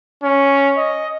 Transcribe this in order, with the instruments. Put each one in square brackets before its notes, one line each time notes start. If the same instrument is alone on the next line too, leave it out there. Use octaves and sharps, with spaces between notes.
[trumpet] C#4
D#5